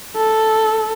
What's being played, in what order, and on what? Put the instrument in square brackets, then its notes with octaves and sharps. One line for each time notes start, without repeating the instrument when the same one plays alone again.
[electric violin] A4